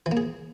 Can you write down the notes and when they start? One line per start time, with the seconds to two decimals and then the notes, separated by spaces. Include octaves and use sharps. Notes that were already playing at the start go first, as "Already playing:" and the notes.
0.06 E3
0.11 A#3
0.17 G#4